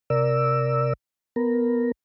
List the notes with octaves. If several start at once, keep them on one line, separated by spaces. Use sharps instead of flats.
C3 A#4 D5 E6
B3 A#4